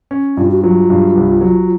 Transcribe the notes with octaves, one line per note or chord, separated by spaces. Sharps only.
C#4
G2 F4
F#4
F#3 F4
G2
C2
F#3